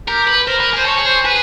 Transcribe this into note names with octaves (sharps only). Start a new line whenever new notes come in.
G4 A#4
B4
A#4 C5
B4
G#4 C5
A4 C#5
G#4
C5
G#4 B4